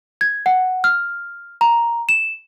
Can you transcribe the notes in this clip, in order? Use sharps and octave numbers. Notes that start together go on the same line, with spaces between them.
G#6
F#5
F6
A#5
E7